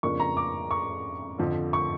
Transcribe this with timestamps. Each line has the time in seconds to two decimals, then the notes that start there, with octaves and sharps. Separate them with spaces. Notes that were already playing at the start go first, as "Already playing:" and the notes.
0.03 F2 C#3 F3 A#3 D4 C#6
0.20 A#5
0.37 D6
0.71 C#6
1.38 F2 D3 F3
1.73 C#6